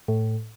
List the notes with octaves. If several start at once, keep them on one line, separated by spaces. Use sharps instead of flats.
A2